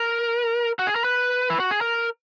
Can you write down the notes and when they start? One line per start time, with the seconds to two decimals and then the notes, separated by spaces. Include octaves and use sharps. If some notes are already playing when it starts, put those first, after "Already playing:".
Already playing: A#4
0.79 F#4
0.87 G#4
0.96 A#4
1.04 B4
1.50 E4
1.60 F#4
1.71 G#4
1.81 A#4